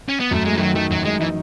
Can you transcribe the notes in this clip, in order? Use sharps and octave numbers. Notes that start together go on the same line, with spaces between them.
C#4
B3
F#2 A3
G#3 A3
E3
D#3 F#3
D#3 A3
F#2 F#3
G#3 D#4
E3 D#4